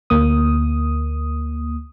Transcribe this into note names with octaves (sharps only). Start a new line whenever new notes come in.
D2 A#3 D#6